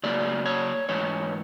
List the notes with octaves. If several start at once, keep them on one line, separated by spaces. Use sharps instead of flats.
C#3 F#3 A#3 D5
C#5
G#2 E3 C#5